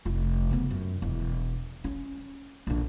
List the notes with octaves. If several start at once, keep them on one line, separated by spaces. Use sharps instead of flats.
F1 F4
C#3 B3
F#2
E1
C#4
A#1 D3